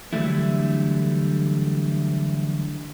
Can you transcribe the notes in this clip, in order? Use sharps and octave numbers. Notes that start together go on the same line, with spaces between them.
D3 E3 F#3 G3 A3 E4